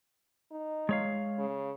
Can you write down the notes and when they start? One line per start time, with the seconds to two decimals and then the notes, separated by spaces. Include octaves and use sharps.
0.51 D#4
0.89 G#3 C#5 F5
1.38 C#3